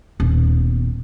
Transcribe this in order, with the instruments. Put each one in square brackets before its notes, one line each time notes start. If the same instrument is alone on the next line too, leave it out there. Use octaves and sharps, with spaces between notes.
[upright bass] D#1 B3